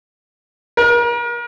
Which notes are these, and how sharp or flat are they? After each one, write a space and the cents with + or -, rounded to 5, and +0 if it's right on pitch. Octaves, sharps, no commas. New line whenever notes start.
A#4 +40